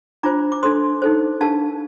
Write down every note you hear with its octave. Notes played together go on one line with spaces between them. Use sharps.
D4 F4 C5 A#5 D6
D6
D4 A4 C5 C6 D#6
D#4 A4 C5
D4 G4 A#4 F5 A5